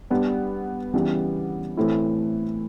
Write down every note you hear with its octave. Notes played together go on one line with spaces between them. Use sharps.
G3 B3 D4
C#3 E3 G3 B3
A2 E3 A3 C4 E4